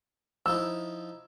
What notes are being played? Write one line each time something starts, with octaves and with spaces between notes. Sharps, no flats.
F3 D#4 E4 E6